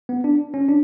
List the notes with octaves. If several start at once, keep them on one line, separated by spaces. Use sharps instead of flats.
B3
D4
C#4
D4